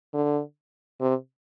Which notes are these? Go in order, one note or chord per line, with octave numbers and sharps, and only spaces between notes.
D3
C3